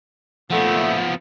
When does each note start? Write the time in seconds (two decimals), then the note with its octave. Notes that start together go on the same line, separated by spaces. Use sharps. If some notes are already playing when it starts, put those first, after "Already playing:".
0.50 A#2 F3 A3 B3 F#5